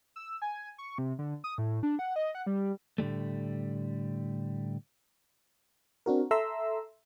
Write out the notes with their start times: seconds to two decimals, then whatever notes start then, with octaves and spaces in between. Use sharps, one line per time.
0.16 E6
0.42 G#5
0.78 C#6
0.98 C3
1.19 D3
1.44 D#6
1.58 A2
1.83 D4
1.99 F#5
2.16 D#5
2.35 F#5
2.46 G3
2.98 A2 D3 G3 A3
6.06 C4 D4 F#4 A#4
6.31 A4 E5 A#5 C6 E6